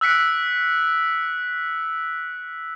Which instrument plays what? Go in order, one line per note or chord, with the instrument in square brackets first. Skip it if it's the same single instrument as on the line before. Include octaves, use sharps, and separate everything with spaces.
[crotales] E6 F#6 B6 C#7 D7